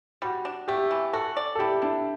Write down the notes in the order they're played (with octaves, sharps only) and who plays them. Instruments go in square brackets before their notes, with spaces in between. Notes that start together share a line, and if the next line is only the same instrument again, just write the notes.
[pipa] G3 [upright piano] F#4
[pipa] D4
[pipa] A3 [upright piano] G4
[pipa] E3
[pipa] F#4 [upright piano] A4
[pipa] D5
[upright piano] A4
[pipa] E4 [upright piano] G4
[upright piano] D4 [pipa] E4